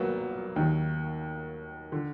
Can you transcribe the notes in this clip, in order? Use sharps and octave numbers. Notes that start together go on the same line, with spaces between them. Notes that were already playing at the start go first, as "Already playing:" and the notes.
Already playing: G#1 F#3 A#3 B3
D#2 D#3
D3